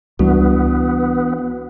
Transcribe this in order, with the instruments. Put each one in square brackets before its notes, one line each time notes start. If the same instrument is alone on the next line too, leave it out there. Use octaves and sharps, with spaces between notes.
[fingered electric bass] C#2 G3 [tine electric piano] E3 D4 F#4 [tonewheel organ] B3